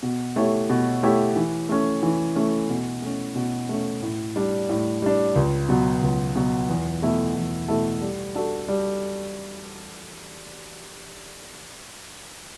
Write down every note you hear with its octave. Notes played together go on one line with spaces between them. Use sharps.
B2
A3 E4 G4 C#5
B2
A3 E4 G4 C#5
E3
A3 C#4
E3
A3 C#4
B2
A3 C#4
B2
A3 C#4
A2
G3 D4
A2
G3 D4
C#2
B2 F#3
C#2
B2 F#3
E2
B2 A3 E4 A4
E2
B2 A3 E4 A4
G3
D4 F#4 A4
G3